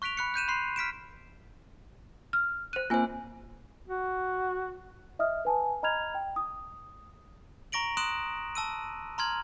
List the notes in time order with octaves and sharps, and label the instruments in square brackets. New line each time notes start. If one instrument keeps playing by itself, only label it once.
[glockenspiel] C#6 F#6 B6 D7 F7
B5 F#6 C#7
F#6 G6 D#7 E7
B5 C6 F#6 C7
F6 B6 D7 E7
[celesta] F6
[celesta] C5 D#7 [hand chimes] F#6
[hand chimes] A#3 C4 C5 [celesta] F4 G#5
[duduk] F#4
[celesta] D#5 E5 D#6 F6
B4 G#5 A5
D#5 A#5 B5 F6 G#6 F7
G5
D#6
[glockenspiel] A#5 C#6 A#6 D7 F#7
C6 D#6 F#6 D7 E7 F#7
A5 E6 D#7
A#5 C6 F6 G#6 F#7